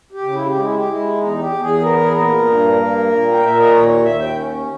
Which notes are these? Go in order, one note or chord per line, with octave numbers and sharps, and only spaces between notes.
G4
C#3
E4
G4
G#3
E4
G4
G#3 E4
E2 D#4
G4
E2
G#4
B3 A#4
G#4
A#2 A#4
G2
A#3
A#2
G5
A#2 E5
D#5
D#2 C#5
C#5
D#2 E5
G5
C#4